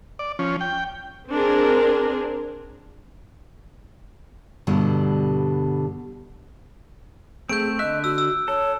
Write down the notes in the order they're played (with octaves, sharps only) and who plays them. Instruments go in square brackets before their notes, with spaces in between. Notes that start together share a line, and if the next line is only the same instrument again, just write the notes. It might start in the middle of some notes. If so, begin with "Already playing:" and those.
[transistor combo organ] D5
F3 C#4
G5
[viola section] C4 D4 G#4 A#4
[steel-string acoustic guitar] G2 B2 D3 G3
[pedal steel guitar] A3 C4 [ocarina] G#4 [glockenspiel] G6 D7
[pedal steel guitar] D3 E5 [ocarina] D#5 [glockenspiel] F#6
[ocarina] F#4 [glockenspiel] E6
[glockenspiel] E6
[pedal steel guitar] A4 [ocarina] C#5